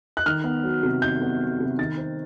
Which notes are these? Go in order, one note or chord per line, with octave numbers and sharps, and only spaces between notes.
F#6
D#3 F6
B3
F#3
C3
D#3 G6
B3
F#3
C3
D#3 A6
C4